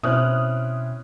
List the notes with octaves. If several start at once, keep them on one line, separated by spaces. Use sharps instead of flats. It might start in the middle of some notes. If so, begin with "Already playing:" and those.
B2 C4 C#4 E4 D#6 F6 F#6